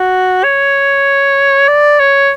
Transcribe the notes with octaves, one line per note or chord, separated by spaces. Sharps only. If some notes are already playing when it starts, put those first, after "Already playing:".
Already playing: F#4
C#5
D5
C#5